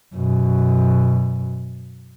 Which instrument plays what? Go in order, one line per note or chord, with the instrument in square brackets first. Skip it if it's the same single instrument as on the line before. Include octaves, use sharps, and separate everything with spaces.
[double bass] F#2 B2